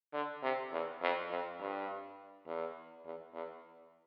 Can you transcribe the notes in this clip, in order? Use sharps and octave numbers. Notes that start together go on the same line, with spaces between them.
D3
C3
E2
F2
F2
G2
E2
E2
E2